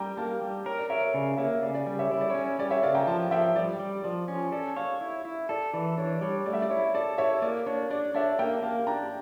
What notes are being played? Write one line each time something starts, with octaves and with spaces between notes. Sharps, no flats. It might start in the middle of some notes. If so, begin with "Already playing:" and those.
Already playing: G3 G5 A#5
A#3 F5 A5
G3
A#4 C#5
D5
A#4 C#5 E5
C#5
C#3 D5
A#3 C#5 E5
C#3 D5
D5
G3 D5
C#5 E5
E4 C#5
D5
C#5
C#4
G3 D5
C#5 E5
C#3 D5 F5
G5 A#5
F3 F5 A5
F3 E5 G5
G3 D5
G3
F3 D5
C#4
A4 D5
C#5 D5 F5
E4
E4
A4 D5
E3 D5
D4 C#5
G3 C#5
A3 D5
E5
D5
E4 C#5
A4 D5
E4 C#5 E5
A#3 D5
D4 C#5
D4 D5
D4 C#5 E5
A#3 E5 G5
A#3 F5 A5
D4 G5 A#5